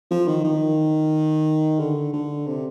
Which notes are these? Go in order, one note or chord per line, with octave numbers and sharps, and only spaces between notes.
F3
D#3
D#3
D3
D3
C3